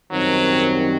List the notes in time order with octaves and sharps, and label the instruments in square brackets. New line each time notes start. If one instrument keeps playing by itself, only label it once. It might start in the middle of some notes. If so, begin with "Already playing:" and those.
[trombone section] F#2 D#3 G3 C4 [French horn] F#3